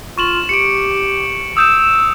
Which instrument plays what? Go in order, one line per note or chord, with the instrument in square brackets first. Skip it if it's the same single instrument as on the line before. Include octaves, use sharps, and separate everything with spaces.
[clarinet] F4 [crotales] C#6 E7 F#7
[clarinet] G4 [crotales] C#7 D7
[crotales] D#6 G6 E7 [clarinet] E6